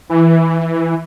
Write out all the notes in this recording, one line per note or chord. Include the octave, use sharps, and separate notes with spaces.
E3